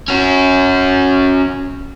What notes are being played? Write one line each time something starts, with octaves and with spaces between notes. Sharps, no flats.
C#4 F#4